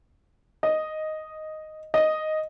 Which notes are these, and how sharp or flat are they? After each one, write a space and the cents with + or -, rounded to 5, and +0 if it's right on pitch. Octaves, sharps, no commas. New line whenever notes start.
D#5 +0
D#5 +0